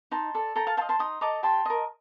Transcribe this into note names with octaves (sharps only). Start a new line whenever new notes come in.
D#4 A5 C6
A4 D5
A4 G5 A#5
F5 A5
C5 D#5 F5 A5
A5 C6
D#4 C6 D#6
A4 D#5 A#5 D6
G4 A5 C6
A#4 D#5